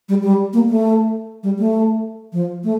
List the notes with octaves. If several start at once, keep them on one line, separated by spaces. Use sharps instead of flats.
G3
G3
A#3
A3
G3
A3
F3
A3